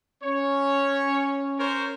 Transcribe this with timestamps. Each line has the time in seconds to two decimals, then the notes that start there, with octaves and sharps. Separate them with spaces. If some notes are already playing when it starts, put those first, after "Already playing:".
0.23 C#4 C#5
1.58 A#4 C5 C#5